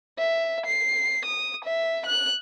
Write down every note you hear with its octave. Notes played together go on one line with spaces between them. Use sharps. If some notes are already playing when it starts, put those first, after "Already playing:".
E5
C7
D#6
E5
F#6